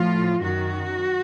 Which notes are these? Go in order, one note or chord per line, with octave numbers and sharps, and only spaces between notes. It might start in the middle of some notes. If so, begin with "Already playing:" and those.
Already playing: A2 F3 F4
F#2 D#3 F#4